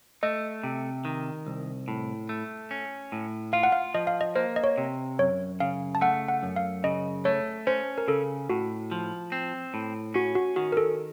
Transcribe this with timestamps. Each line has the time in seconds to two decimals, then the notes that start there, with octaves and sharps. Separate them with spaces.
0.23 A3 D#5
0.63 C3
1.05 D#3
1.47 C2
1.88 A2
2.29 A3
2.71 C#4
3.12 A2
3.53 F4 F5
3.63 F#5
3.72 F5
3.94 F3 D#5
4.07 F5
4.21 D#5
4.36 A#3 C5
4.56 D#5
4.64 C#5
4.78 C3
5.19 F#2 C#5
5.60 C#3 F5
5.95 A5
6.01 A3 F#5
6.28 F#5
6.43 F#2
6.56 F5
6.84 C#3 D#5
7.25 A3 C#5
7.67 C#4 C5
7.98 A#4
8.08 C#3 A4
8.50 A2 F#4
8.92 F3
9.32 C4
9.74 A2
10.14 C#4 F#4
10.35 F#4
10.56 D#3 F#4
10.72 A#4
10.77 A4